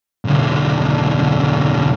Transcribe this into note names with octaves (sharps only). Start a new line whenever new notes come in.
B1 D3